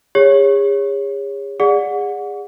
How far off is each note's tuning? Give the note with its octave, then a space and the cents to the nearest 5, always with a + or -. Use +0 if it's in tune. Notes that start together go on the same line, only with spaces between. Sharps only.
G#4 -40 C#5 +0
G#4 -30 D5 +0 F#5 -25